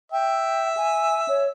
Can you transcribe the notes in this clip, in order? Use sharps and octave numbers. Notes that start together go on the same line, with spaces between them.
E5 G5
G#5
C#5